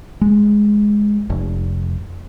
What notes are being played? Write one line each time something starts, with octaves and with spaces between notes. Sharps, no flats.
G#3
F1